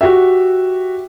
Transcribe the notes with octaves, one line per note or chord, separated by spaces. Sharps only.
F#4 G4 E5